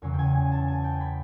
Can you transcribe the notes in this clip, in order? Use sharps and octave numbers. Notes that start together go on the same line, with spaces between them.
E2 C#3 F#3 G#5
G5
G#5
G#5
A5
G#5
G5
B5